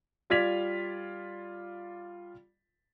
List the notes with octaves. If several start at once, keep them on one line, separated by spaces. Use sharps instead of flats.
G3 F4 D5 G#6 B6 F7